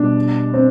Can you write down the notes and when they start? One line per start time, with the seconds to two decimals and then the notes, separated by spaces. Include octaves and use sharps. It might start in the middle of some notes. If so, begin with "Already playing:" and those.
Already playing: B2 G3 B3 D4
0.54 C4